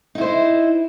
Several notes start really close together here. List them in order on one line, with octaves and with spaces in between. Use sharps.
D#4 E4 C5